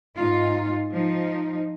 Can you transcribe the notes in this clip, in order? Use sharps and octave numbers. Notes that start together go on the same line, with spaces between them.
G#2 D#4 F4
F3 D#4